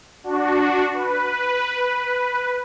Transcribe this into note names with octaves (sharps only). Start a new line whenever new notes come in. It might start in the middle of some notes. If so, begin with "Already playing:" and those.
D4 F#4
B4